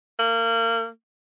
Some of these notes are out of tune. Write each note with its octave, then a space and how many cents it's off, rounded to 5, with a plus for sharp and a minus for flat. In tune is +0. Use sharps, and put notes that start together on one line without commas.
A#3 -30